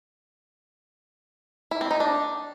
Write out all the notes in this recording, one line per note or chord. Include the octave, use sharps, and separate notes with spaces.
E4
C4
D#4
D4